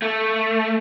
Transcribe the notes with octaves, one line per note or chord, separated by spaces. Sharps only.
A3